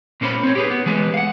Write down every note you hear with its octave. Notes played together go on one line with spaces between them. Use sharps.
A#2 A#3 C#4 B4 C5 B5
C4 C#5
G4 G#4 B4
B3
E3 G#3 B4
F5 F#5